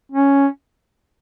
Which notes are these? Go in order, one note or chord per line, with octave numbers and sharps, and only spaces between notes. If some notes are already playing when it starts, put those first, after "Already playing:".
C#4